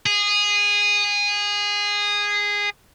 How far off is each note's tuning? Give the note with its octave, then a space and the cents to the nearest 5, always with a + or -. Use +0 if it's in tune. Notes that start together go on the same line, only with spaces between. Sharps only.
G#4 -15